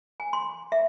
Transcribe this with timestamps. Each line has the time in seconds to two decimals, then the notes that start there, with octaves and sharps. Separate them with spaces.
0.20 G#5
0.33 C6
0.72 E5